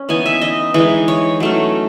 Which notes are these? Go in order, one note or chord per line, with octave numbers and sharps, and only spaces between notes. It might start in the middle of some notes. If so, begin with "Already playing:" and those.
Already playing: C#4
E3 B3 D#4 G#5
E5
D#5
E3 G#3 D#4
C#5
F#3 A3 C#4